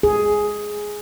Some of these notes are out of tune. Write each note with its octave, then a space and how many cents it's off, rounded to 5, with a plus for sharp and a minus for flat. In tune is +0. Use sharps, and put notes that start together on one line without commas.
G#4 +5